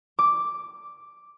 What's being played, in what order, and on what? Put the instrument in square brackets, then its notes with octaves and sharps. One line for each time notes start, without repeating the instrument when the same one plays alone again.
[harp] D6